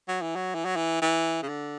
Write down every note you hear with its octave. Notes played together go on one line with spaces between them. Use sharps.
F#3
E3
F#3
E3
F#3
E3
E3
C#3
D3